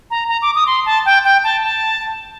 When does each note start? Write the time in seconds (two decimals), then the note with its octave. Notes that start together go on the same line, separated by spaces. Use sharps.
0.11 A#5
0.29 A#5
0.42 D6
0.55 D#6
0.67 C6
0.86 A5
1.05 G5
1.24 G5
1.44 A5
1.63 A5